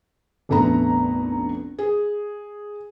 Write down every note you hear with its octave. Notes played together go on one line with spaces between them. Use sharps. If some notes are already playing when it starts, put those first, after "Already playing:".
F1 A#1 A3 B3 A#5
G#4